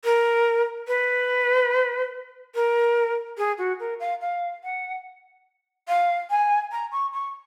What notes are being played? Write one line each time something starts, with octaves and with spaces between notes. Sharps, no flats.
A#4
B4
A#4
G#4
F#4
A#4
F5
F5
F#5
F5
G#5
A#5
C#6
C#6